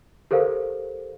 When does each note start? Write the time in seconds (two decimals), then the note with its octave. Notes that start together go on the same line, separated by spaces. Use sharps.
0.31 G4 A4 A#4 C5 F5